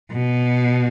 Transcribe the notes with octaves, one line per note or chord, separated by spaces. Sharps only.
B2